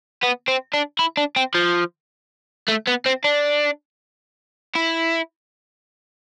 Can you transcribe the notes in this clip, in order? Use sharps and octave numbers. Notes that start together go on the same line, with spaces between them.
B3
C4
D4
E4
D4
C4
F3
A3
B3
C4
D4
E4